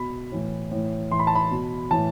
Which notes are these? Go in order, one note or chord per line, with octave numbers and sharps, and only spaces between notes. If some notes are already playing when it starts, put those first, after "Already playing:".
Already playing: B2 B5
A2 E3
A2 E3
A2 E3 C6
B5
A5
B5
B2
A2 E3 A5